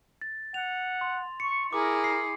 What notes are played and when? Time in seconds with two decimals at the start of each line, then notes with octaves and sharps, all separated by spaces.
0.21 A6
0.54 F#5 F7
1.01 C6
1.40 C#6 C#7
1.73 E4 G#4 A#4 D6
2.04 C7